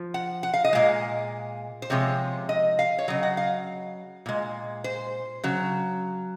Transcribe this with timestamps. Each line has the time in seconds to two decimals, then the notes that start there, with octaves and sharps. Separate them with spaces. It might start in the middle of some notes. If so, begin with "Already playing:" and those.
Already playing: F3
0.14 F#5
0.43 F#5
0.54 F5
0.64 D#5
0.73 A#2 G#3 F5
1.82 C5
1.90 C3 F3 G#3 C#5
2.49 D#5
2.79 F5
2.99 C#5
3.08 C#3 F#3 D#5
3.23 F#5
3.37 F5
4.26 A#2 G#3
4.84 C5
5.44 C#3 F#3